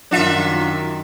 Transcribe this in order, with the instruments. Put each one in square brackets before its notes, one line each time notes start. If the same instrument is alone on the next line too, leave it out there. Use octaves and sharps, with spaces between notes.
[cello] F#2 D#3 [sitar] D4 F4 E5